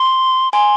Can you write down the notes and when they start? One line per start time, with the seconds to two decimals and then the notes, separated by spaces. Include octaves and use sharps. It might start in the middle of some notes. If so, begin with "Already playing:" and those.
Already playing: C6
0.53 G#5 C6